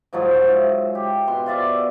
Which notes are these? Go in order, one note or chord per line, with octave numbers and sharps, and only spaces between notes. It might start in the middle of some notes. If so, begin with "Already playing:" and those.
G#2 F3 F#3 G#3
E5
G4
B2 C6
F4 D5 E5 F5